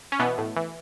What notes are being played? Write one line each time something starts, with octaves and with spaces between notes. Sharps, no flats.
C#4
B2 E3 B3
A2
E3